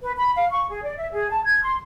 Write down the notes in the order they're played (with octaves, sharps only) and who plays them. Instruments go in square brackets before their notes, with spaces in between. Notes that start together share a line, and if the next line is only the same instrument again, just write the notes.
[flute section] B4
B5
F5
C#6
G#4
D5
E5
G#4
A5
G#6
C6